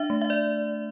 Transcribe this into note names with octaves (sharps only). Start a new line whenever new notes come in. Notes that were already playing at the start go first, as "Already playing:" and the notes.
Already playing: D4 E5
A3
E5
D5